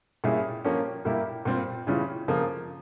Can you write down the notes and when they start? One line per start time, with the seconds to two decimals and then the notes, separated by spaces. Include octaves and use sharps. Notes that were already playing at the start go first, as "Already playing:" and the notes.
0.24 A#2 G3 C#4 E4 G#4
0.64 F3 A#3 C#4 G4
1.05 A#2 G3 A#3 E4 G4
1.45 A#2 G3 C4 F4
1.87 C#3 E3 G3 C#4 F4
2.28 C#3 F3 A#3